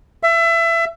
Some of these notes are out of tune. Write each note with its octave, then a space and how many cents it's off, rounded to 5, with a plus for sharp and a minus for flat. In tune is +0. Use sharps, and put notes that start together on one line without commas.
E5 +25